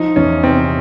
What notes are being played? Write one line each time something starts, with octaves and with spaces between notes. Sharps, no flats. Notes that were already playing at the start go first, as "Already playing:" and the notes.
Already playing: F3 D#4
E2 C#4
C3 C4